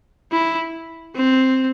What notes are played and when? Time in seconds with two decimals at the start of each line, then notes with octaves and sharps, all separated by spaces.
0.32 E4
1.15 C4